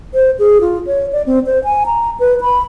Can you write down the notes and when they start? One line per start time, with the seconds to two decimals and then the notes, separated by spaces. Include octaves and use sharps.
0.14 C5
0.39 G#4
0.61 F4
0.87 C#5
1.13 D5
1.26 C4
1.46 C5
1.64 G#5
1.86 A#5
2.20 B4
2.41 B5